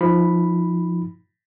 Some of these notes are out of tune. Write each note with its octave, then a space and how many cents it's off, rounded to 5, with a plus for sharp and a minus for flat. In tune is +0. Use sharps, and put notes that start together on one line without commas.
F3 +0 D#4 +30 B5 +0